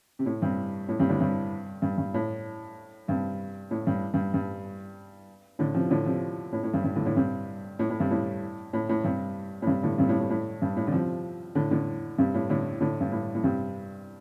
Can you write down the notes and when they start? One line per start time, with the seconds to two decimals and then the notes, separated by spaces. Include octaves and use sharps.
0.19 C3
0.26 A2
0.42 G2 C3
0.89 A2
0.99 G2 C3
1.09 A2 D3
1.20 G2 C3
1.82 G2
1.98 G2
2.14 A2
3.08 G2 C3
3.71 A2
3.87 G2
4.14 G2
4.34 G2
5.59 A2 D3
5.74 C3 F3
5.90 A2 D3
6.06 C3 F3
6.53 A2
6.63 A2
6.74 G2
6.84 G2
6.96 A2 D3
7.06 A2 D3
7.16 G2 C3
7.79 A2
7.90 A2
8.00 G2 C3
8.11 A2
8.73 A2
8.89 A2
9.04 G2 C3
9.62 A2
9.67 G2 C3
9.83 A2 D3
9.98 G2 C3
10.09 A2
10.20 A2
10.30 A2
10.62 G2
10.77 A2
10.87 D3
10.92 C3 F3
11.55 A2 D3
11.71 A2 D3
12.18 G2 C3
12.34 A2
12.49 A2 D3
12.81 A2 D3
13.01 G2
13.12 A2
13.35 A2
13.44 G2 C3